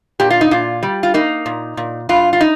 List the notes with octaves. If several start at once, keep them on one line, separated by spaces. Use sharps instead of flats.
A#2 G4
F4
D#4
A#2 F4
G3
F4
A#3 D#4
A#2
A#2
G2 F4
F4
D#4